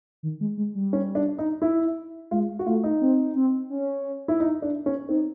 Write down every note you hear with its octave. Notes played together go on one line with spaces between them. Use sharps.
D#3
G#3
G#3
G3
C#4
D4
D#4
E4
G#3 F4
F#4
A3 F4
D#4
C4
C4
C#4
E4
D#4
D4
C#4
C4 D#4